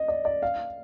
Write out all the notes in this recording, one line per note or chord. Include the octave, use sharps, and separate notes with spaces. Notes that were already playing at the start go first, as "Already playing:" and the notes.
Already playing: D#5
D5
D5
F5